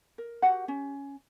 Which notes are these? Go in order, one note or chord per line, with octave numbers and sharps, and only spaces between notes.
A#4
F#4 G4 F#5
C#4